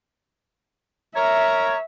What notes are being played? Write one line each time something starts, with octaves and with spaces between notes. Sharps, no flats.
A#4 C#5 E5 A#5